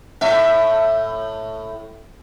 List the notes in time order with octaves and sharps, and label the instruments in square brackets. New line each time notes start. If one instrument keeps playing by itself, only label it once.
[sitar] A2 E5